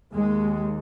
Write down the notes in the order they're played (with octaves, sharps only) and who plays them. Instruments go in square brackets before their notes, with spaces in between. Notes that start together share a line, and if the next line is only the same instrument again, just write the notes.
[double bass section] D#2 G#3